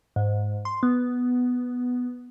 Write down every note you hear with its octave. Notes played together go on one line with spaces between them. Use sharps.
G#2
C6
B3